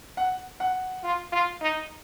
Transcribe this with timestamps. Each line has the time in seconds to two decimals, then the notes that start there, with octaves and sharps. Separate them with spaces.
0.17 F#5
0.60 F#5
1.04 F4
1.32 F4
1.61 D#4